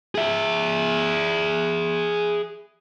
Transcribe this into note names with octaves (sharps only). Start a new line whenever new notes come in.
G#4 E5